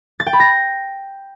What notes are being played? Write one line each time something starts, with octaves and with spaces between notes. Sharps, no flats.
A6
G5
B5
A#6